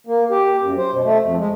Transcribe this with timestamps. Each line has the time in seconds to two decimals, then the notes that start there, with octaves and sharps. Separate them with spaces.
0.07 A#3
0.31 G4
0.62 F#2
0.78 C5
0.92 B2
1.05 A3
1.23 F2
1.38 G#3